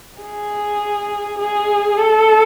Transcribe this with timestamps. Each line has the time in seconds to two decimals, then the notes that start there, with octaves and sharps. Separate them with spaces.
0.21 G#4
1.39 G#4
1.97 A4